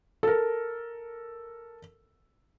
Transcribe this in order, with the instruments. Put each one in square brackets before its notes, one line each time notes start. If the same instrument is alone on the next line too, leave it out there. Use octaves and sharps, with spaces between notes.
[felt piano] A4 A#4